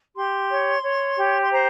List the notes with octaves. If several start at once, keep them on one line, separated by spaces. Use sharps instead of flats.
G4 C6
C#5
C#5
G4
C6
C5 A#5